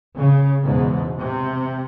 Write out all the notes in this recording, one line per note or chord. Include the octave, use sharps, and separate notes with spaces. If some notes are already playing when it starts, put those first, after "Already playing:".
C#3
E2 G#2 B2
C3